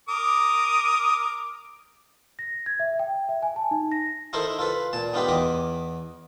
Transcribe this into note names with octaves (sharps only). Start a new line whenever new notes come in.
A#4 D6 D#6
A#6
G#6
E5
G5
E5
G#5
A5
D#4
A#6
D#4 E4 A4 A#4 C5
F4 A4 B4
A#2 A5
B3 D#4 F4 G4 B4
E2 B3 D#5 D6